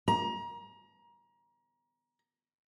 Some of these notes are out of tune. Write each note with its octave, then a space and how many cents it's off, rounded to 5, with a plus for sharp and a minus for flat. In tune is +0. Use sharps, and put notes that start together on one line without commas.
A#5 +30